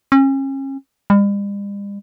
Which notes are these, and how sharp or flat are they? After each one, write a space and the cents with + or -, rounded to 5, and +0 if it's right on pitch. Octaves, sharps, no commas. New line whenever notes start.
C#4 -35
G3 +45